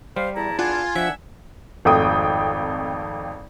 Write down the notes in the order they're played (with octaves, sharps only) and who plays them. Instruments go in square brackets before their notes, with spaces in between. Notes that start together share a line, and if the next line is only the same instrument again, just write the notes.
[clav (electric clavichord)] G3 [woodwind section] C5 F5
[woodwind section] E2 E4 A5 [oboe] A#5
[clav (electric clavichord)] D4 F#5 [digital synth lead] F4 [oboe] G#5
[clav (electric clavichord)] F3 [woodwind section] D4 F#5 [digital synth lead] E5
[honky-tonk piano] G#1 F2 A3 G5 D#6